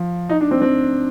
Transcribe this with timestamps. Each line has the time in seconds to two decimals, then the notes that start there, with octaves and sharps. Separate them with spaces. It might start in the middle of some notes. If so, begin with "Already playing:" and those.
Already playing: F3
0.29 D#4
0.41 D4
0.51 C4
0.62 C4